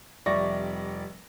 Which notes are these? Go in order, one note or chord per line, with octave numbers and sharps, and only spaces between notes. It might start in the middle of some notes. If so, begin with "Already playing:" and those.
F1 G3 D5 E5 C#6 A#6